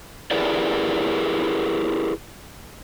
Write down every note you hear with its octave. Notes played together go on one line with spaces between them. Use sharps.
E4 G4 G#4 A#4 B4 D5